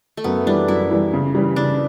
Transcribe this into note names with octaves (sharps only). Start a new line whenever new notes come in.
A3
F#2 B3
E3 G3 D4
F#2 E4
E3 G3
C#3
E3 G3
C#3 D4